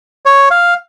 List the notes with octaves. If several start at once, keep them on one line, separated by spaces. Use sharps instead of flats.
C#5
F5